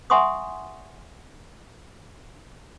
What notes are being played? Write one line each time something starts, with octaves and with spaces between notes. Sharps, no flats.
E5 F#5 G#5 C6 C#6 D#6